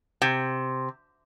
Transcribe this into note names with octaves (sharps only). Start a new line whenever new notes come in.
C3